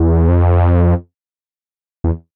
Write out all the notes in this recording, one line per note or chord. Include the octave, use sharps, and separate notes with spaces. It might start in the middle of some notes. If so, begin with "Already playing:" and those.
Already playing: E2
F2
E2